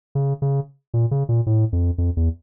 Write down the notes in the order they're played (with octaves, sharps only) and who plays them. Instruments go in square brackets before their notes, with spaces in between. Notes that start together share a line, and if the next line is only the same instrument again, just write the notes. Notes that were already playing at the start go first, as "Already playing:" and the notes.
[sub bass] C#3
C#3
A#2
C#3
A#2
A2
F2
F2
E2